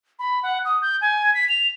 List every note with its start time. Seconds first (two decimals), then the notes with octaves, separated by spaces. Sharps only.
0.19 B5
0.43 F#5
0.65 D#6
0.82 G6
1.01 G#5
1.34 B6
1.49 F7